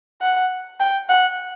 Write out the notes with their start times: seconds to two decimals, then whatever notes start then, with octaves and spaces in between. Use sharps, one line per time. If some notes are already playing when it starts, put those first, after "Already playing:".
0.22 F#5
0.80 G5
1.09 F#5